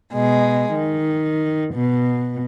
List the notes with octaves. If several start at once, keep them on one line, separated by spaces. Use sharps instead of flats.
B2 G#3
D#3
B2